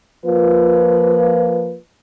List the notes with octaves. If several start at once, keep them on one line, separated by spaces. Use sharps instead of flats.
F3 A#3 F4 B4